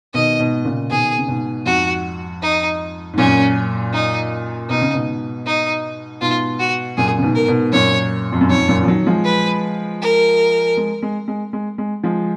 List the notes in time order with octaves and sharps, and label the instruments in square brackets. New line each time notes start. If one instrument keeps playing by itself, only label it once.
[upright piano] B2 D#3 [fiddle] D#5
[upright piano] G#2 B2
A#2 C#3
[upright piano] B2 D#3 [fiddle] G#4
[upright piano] C#3
G#2 B2
[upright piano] F2 G#2 [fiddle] F#4
[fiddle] D#4
[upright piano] G#2
[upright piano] F#2 A#2 [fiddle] C#4
[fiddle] D#4
[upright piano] B2 [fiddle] D#4
[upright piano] C#3
G#2 B2
[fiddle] D#4
[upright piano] G#2 B2 [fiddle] F4
[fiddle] F#4
[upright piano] F#2 A#2 [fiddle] G#4
[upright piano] C#3
G#2 B2
[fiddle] A#4
[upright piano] G#2 B2
[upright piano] F#2 A#2 [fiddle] C#5
[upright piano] F2
F#2
[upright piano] F2 G#2 [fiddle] C#5
[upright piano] F#2 A#2
F3
D#3 F#3
F3 G#3
[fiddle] B4
A#4
[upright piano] G#3
G#3
G#3
G#3
G#3
F3 G#3